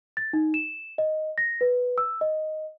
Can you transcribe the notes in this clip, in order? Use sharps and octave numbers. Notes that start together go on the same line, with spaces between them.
A6
D#4
E7
D#5
A#6
B4
E6
D#5